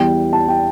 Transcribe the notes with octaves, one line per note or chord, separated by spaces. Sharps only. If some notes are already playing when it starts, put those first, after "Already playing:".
Already playing: E2 E3 G3 G5
A5
G5